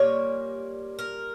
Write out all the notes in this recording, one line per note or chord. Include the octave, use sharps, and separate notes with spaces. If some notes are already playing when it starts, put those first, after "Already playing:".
Already playing: A#2 G3 A#3 C#5
A#4